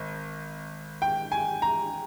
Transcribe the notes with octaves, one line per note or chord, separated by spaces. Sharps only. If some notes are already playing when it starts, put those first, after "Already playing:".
Already playing: G#1
G5
G#5
A#5